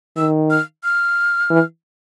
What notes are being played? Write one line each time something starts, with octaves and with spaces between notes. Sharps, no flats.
D#3 E6
F6
F6
E3